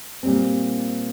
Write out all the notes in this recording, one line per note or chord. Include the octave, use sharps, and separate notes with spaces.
A#2 G3 C4